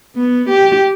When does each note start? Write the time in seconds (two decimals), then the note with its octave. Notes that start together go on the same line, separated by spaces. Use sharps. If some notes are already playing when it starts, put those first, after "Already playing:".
0.16 B3
0.49 G4